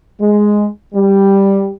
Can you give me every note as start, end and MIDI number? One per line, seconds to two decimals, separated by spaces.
0.21 0.66 56
0.93 1.71 55